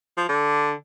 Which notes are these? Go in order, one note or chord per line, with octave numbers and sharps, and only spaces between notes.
F3
D3